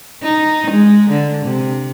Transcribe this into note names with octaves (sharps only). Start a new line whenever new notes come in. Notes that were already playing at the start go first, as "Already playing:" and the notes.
D#4
G#3
D3
C3